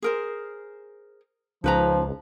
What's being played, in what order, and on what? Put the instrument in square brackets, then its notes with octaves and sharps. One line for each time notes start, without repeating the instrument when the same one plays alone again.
[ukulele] G#4 A#4 C5
[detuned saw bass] C#2 [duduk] F3 [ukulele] D#4 B4 A#5